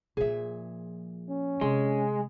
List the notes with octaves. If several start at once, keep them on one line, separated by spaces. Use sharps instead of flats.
A#2 F3 G#4 E5
C#4
C3 G#3